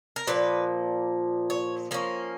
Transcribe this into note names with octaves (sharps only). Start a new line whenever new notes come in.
A#4
A#2 F3 A#3 B4
C#5
F3 A#3 C#4